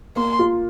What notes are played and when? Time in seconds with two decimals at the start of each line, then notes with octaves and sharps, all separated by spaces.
0.16 A#3 C6
0.39 F4